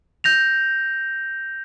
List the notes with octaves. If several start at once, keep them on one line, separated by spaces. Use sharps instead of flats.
G6 A#6 F7